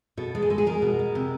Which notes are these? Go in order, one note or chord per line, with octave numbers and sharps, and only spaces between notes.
B2 A4
G#3
G#4
G#3 A4
G#4
G#3 A#4
B2
G#3
C3